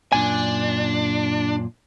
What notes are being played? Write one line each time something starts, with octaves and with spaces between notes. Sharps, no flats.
F#2 A#2 D4 G#5